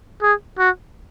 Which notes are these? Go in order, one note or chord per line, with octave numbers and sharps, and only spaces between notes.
G#4
F#4